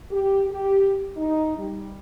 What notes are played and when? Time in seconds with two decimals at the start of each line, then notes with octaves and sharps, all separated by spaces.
0.11 G4
0.50 G4
1.17 D#4
1.58 G3